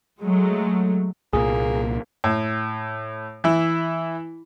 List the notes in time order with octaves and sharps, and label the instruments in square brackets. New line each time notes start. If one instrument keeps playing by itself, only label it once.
[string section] F#3 G#3 A3
[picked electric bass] C2 A#2 [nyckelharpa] A#3 [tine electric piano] G#4
[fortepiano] A2
E3 E4